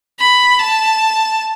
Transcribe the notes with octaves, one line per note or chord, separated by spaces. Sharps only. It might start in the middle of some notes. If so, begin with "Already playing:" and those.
B5
A5